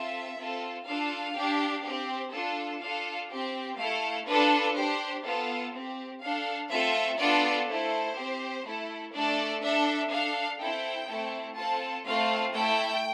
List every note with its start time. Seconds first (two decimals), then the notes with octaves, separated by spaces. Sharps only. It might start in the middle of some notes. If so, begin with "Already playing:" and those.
Already playing: C4 F4 A4 E5
0.37 C4 F4 A4
0.85 D4 F4 A4 F5
1.34 D4 G4
1.83 C4 G4
2.31 D4 F4 A4
2.80 D4 F4 A4 F5
3.29 C4 G4 G5
3.78 A3 E4 A4 F5
4.27 D4 F4 A4 B4
4.75 D4 G4 C5
5.24 B3 F4 A4 F5
5.73 C4 G4
6.21 D4 A4 F5
6.70 A3 C4 F4 A4 E5
7.18 B3 D4 F4 A4 D5
7.67 A3 E4 A4 C5
8.16 C4 G4
8.65 A3 E4 A4
9.13 A3 D4 A4 D5
9.62 D4 A4 E5
10.11 D4 A4 F5
10.59 C4 E4 A4 G5
11.08 A3 C4 E4 A4
11.57 C4 F4 A4 A5
12.05 A3 C4 F4 A4 F5
12.54 A3 E4 A4 G5